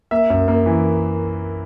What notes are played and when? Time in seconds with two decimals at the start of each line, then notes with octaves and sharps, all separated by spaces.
0.11 A#3 E5
0.30 F#2
0.48 A#3
0.66 E3